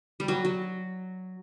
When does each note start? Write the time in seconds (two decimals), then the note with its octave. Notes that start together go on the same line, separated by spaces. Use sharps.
0.20 G3
0.28 F#3
0.45 F#3